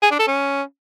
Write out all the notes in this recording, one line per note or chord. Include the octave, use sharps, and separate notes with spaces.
G#4
D4
A4
C#4